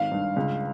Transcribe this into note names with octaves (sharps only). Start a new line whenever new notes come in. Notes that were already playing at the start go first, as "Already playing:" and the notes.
Already playing: G#1 F5
G2
C#2